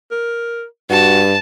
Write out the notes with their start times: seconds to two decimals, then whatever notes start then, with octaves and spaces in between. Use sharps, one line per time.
0.11 A#4
0.90 G2 F#4 A5